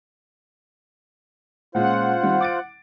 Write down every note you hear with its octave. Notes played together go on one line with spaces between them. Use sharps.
A#2 G#3 C#4 F4 C5 F#5
D#3 G3 C4
D6 A6 D7